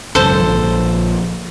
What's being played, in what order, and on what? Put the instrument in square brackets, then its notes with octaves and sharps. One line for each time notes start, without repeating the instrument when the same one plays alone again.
[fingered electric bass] G#1 C#2 F#2 [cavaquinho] A4 C5
[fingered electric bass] A#1 D3 F3